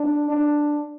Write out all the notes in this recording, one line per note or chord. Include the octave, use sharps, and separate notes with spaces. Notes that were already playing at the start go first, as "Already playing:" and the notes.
Already playing: D4
D4